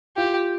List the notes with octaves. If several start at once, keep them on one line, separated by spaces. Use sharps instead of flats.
F4 G4